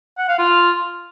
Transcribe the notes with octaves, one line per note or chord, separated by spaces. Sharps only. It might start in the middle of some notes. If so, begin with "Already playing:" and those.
F#5
F5
F4